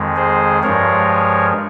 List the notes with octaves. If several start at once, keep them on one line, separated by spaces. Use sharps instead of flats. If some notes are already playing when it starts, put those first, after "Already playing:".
Already playing: F2 D#3 G#3
G#4 C5
G2 F3 G#3 A#4 C#5